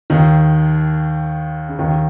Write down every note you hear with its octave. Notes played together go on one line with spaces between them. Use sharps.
D#2 D#3
C#3
D#2 D#3